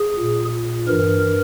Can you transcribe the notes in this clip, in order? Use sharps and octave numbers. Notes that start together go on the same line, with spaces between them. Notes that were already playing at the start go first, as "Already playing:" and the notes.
Already playing: G#4
A#2
G2 E3 A#4